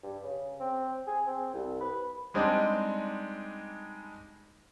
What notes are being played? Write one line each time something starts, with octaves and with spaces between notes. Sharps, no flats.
G2
C#3
C4
G#4
C4
C2
B4
G3 G#3 C4 D4 D#4